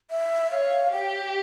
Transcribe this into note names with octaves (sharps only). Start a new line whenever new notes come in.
E5
C#5 F5
G4 G5